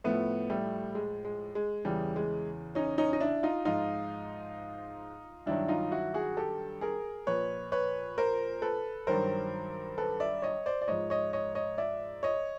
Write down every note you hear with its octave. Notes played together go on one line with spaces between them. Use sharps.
A2 F3 A3 B3
G3 A3
G#3
G#3
G#3
E2 C#3 E3 G3
G#3
C#4 D#4
C#4 D#4
D#4
D4 E4
D#4 F4
G#2 F3 D#4 F4
G2 D#3 F#3 D4 E4
D#4 F4
E4 F#4
F#4 G#4
G4 A4
G#4 A#4
A#2 F3 B4 C#5
B4 C#5
A#4 C5
A4 B4
G2 D#3 F#3 A#4 C5
A4 B4
D5 E5
C#5 D#5
C5 D5
D5
G#2 F3 C#5 D#5
C#5 D#5
C#5 D#5
C#5 D#5
D5 E5
C#5 D#5